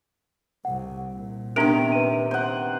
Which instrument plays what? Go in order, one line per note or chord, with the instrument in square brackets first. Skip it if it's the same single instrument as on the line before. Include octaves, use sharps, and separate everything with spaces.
[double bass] C2 C3 [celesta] F#5
[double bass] A#2
[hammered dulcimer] C3 D#3 [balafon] B3 D4 A#4 [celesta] D7
[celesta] B4 D#7
[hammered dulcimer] C5 F#5